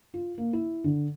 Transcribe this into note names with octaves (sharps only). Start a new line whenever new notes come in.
F4
A#3
E4
D3